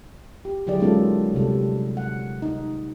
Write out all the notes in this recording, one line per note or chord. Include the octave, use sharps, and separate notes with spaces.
G4
D3 F#3 E4 G4 G#4 D5
G#3 A#3 C#4 D#4 F4 A4
C3 G3 A4
F#5
D#4